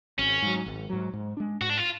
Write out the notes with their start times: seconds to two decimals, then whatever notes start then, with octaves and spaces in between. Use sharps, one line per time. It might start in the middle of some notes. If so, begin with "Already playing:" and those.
0.18 G#1 C#4
0.42 G#2 F#3
0.66 G#1
0.90 G#2 F#3
1.13 G#2
1.37 G#3 D4
1.61 G#2 F#4
1.70 D4
1.77 F4